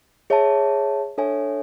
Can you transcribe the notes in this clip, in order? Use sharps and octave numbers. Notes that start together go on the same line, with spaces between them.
G#4 C#5 E5 A5
D4 A4 C#5 E5 G#5